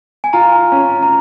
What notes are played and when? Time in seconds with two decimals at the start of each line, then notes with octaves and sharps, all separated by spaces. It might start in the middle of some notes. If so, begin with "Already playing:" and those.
0.24 G#5
0.33 F4 A#5
0.72 C#4
1.03 A#5